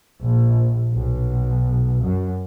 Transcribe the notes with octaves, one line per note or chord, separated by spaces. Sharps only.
A#1
B1
F#2